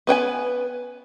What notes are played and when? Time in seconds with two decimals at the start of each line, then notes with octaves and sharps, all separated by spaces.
0.07 B3 B4 G5 G#5